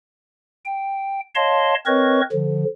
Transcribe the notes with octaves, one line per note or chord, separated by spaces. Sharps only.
G5
C#5 D#5 F5 A5 C6
C4 A#4 B4 C#5 D#5 C#6
D3 F3